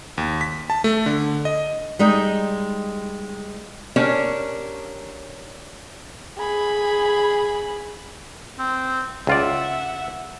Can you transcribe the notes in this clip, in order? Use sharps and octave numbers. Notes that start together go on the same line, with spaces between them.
D#2
B6
A5
A3
D3
D#5
G3 G#3 D#4
C#4 D4 G4 A#4 C#5
G#4 B5
C4
C#2 F4 D5 E5 F#5